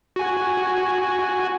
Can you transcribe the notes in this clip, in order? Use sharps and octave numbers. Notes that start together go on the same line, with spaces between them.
F#4 G#5